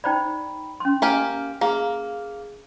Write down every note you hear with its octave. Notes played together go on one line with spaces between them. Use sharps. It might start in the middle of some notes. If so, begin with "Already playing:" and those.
D#4 C5 D5 G5 A#5 B5
C#4 C6
A#3 G4 G#5 F6 D7
A#3 G#4 F5